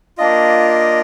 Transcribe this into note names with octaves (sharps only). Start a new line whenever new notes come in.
A#3 D4 F4 D#5